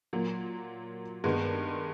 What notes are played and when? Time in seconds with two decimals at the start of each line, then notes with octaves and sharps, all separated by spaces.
0.13 A#2 F#3 A#3
1.24 G2 D#3 G#3 B3